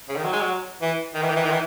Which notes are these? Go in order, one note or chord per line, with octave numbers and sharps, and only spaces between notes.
C#3
D#3
F#3
G#3
F#3
E3
D#3
E3
D#3
E3
D#3
E3